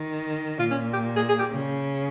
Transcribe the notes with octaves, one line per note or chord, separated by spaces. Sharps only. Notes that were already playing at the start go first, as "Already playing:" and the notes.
Already playing: D#3
A#2 F4
C#4
G4
G#4
G#4
G4
C#3